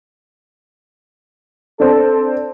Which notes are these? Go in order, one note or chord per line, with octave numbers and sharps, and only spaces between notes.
C4 D4 A4